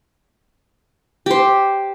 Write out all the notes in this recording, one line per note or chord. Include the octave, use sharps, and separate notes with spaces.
G4 C5